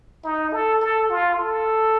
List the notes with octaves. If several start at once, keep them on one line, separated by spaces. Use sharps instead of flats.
D#4
A4
A4
F4
A4